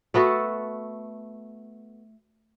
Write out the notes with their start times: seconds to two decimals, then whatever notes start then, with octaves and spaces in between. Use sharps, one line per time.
0.14 A3 B3 F#4 A4